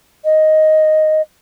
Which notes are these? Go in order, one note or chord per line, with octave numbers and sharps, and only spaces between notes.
D#5